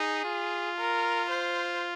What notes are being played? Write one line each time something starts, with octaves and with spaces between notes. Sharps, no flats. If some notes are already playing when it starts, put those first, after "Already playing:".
Already playing: D#4 G#4
F4
A#4
C5